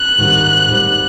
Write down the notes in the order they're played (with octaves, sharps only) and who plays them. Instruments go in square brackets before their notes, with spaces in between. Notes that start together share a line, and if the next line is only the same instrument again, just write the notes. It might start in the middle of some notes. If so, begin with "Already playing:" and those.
Already playing: [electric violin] F#6
[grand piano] G#2 D#3 G3 C4
G#2 D#3 G3 C4